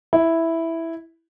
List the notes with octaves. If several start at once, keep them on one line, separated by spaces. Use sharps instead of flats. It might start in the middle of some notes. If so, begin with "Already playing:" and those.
E4